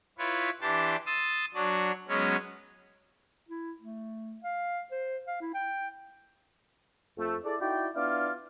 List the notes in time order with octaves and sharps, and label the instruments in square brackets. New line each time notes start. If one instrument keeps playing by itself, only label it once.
[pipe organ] E4 F4 B4 C#5
E3 D4 G4 A5 C6
C6 D#6 E6 A6
F#3 D4 F#4
F#3 G#3 B3 C#4
[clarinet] E4
A3
F5
C5
F5
E4
G5
[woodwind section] F2 A3
E4 G#4 A4 D5
D#4 E4 F#4 D5 G5
B3 D4 E4 F4 F5 D6